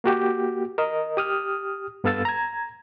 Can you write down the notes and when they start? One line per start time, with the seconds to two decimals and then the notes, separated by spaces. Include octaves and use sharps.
0.04 A#3 F#4 G4
0.78 A#4 D#5
1.17 G4 D#6 F6
2.04 G2 B3 A4 F5 E6 A6
2.25 A#5 G#6